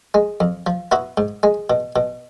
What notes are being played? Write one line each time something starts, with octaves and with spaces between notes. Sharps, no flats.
G#3
F2
F3
B3 E4 F#4
G#2
G#3
B2
B2